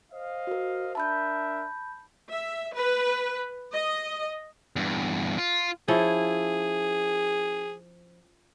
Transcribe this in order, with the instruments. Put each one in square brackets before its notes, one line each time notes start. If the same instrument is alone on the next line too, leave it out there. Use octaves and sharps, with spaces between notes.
[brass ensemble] C5 D#5 F5
[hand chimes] F#4 A#4
[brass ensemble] D4 A#4 E5 [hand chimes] A5 B5 G6
[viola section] E5
B4
D#5
[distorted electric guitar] E2 G2
F4
[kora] F3 C#4 E4 [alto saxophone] G#4